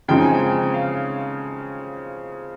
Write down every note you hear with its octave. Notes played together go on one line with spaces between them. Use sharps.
C#3 F3 G#3 C4 D#4 G5
G#5
G5
F5